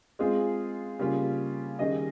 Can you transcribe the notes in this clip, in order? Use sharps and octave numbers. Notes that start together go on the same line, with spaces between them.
G#3 C4 F4 G#4
C#3 G3 A#3 F4
D#3 G3 C#4 G#4 D#5